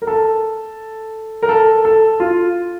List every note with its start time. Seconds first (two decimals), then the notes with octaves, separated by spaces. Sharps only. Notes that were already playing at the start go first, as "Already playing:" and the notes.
0.02 A#4
0.07 A4
1.42 A#4
1.49 A4
1.85 A4
2.20 F4